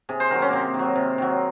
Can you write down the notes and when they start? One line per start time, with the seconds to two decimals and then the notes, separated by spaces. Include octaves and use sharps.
0.09 C3 G#4
0.20 C5
0.31 D#3 F#3 A#4
0.42 C#4
0.49 C3 A#3 C4
0.74 D#3
0.79 F#3
0.96 C3
1.18 D#3 F#3